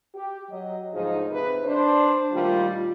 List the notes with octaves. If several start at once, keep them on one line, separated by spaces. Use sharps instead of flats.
G4
F#3 D#5
D2 G#2 F3 D#4 G#4 D#5
C3 B4
D4 C5
A#2 D#3 G3 A3 F4